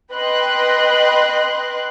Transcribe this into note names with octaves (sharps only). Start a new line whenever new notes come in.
B4 D#5 G5 C6 F#6